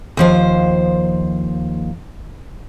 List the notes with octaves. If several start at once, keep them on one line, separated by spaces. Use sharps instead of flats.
D#2 F3 C5